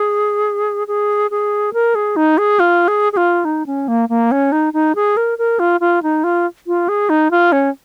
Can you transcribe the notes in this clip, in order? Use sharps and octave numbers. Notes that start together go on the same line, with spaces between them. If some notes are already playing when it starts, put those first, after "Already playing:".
Already playing: G#4
G#4
G#4
A#4
G#4
D#4
G#4
F4
G#4
G#4
F4
D#4
C#4
A#3
A#3
C#4
D#4
D#4
G#4
A#4
A#4
F4
F4
D#4
F4
F4
G#4
D#4
F4
C#4